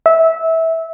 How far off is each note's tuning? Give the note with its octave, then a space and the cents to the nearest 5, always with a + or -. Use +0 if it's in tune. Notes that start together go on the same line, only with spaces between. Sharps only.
E5 -20